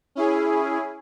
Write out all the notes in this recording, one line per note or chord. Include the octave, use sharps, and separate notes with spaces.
C#4 E4 G#4